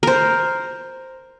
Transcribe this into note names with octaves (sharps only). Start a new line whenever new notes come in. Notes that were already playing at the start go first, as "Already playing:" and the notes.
A#4 C5